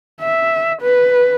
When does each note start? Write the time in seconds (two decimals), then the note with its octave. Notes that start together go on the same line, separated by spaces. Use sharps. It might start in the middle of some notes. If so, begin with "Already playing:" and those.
0.22 E5
0.82 B4